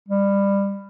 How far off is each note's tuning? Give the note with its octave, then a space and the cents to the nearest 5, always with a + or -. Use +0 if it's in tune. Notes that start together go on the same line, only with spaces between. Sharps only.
G3 +20